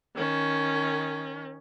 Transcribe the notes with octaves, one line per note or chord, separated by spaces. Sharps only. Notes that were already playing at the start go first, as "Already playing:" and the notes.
D#3 C#4